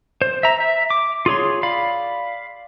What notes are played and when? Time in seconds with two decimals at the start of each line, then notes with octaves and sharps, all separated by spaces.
0.22 C5
0.43 E5 A#5
0.60 E5
0.90 D6
1.26 F4 G#4 C#5 C6
1.63 D5 F5 B5